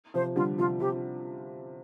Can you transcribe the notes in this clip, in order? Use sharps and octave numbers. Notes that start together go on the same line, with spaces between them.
C3 F3 C5
D3 G3 F4
C3 F3 F4
C3 G4